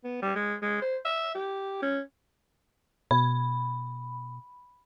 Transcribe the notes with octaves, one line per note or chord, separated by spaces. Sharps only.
B3
G3
G#3
G#3
C5
E5
G4
C#4
B2 B5